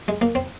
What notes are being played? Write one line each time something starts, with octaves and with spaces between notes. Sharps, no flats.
G#3
A#3
C4